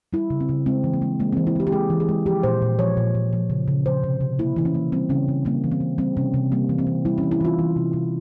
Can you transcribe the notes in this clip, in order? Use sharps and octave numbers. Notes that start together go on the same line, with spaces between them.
G3 E4
C#3
C4
C#3
G#3 C4
E3
A#3
G#3
G#3 A#3
E3 C4
E4
G#3 G4
G4
G#3 G#4
E3
G#4
G#3
F3 G4
A#2 C5
A#2
F3 C#5
A#2
A#2
F3
C#3
C#3
F3 C5
C3
C3
A#3 E4
E3 E4
C#4
A#3
G3 C4
C#3 C#4
C#3
G3 A#3
E3
C4
E3
G3 C4
C3 C#4
C3
G3 A#3
E3
C4
E3
G3 E4
C#4
E3
E4
E3 F4
E3
C3
C3